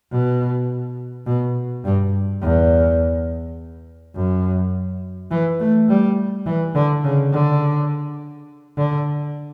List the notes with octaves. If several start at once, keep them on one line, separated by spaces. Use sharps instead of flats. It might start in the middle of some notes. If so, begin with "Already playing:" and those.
B2
B2
G2
E2
F#2
E3
A3
G3
E3
D3
C#3
D3
D3